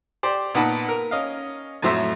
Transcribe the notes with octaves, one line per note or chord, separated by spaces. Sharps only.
G4 C5 D5
A#2 B3 D#4 F#5 A5 B5
A#4
C#4 D#5 F5
F2 A2 F#3 C5 E5